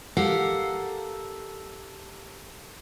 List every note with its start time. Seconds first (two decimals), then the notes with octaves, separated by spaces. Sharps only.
0.17 G4 A4 A#4 F5 F#5